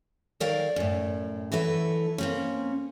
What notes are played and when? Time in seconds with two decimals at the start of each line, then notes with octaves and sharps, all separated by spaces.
0.40 D#3 F#3 A#4 D5 F5 G5
0.76 F#2 A2
1.52 E3 F#3 E4 A4 B4
2.18 A#3 C4 C#4